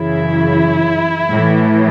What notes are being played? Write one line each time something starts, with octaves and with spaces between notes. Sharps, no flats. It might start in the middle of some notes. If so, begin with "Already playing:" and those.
Already playing: F#2 C#3 E3 E4
A2 E3